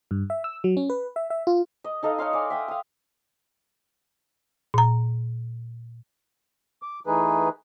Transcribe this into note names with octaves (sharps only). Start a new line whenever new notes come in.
G2
E5
E6
F#3
C#4
B4
E5
E5
F4
D#5
D#4 A4 D#5 F5
D#4 C#5 F5 C6
D5 G#5
E5 G5 D#6
F5 D#6
A#2 A#5
D6
E3 A3 D#4 G#4 B4